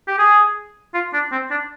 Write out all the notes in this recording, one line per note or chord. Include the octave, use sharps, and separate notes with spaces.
G4
G#4
F4
D4
C4
D4